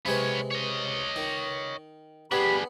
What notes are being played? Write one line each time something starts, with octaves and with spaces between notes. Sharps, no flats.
C3 G#3 B3 B4 C#5
C#5 D#5
D#3
B3 D4 G4 G#4 B5